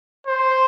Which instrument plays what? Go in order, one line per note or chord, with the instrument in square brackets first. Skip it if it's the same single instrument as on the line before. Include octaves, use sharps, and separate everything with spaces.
[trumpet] C5